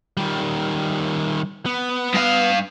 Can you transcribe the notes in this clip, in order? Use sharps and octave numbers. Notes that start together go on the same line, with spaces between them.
D#3 G3
B3
G2 F5